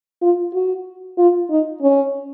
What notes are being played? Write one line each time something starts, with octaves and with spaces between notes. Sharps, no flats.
F4
F#4
F4
D#4
C#4